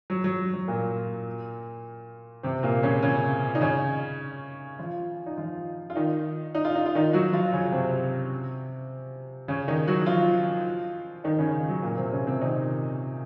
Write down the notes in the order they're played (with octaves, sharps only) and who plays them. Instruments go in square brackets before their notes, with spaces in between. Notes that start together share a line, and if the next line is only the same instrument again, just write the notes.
[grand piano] F#3
F#3
F#3
A#2 A#3
C3 C4
A#2 A#3
C#3 C#4
C#3 C#4
D#4
C#3 C#4
F3 F4
D#4
F3 F4
F4
D#3 D#4
D#4
F4
D#4
F4
D#3 D#4
F#3 F#4
F3 F4
C#3 C#4
C3 C4
C#3 C#4
D#3 D#4
F#3 F#4
F3 F4
D#3 D#4
C#3 C#4
F#3
A#2 A#3
C3 C4
C#3 C#4
C3 C4
D#3 D#4